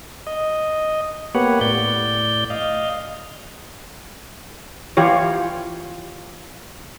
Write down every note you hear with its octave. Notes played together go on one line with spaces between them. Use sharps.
D#5
A#3 B3 G4 B4 C#5 F#5
A2 D5 G6
D#5 F5
E3 F4 G4 C#5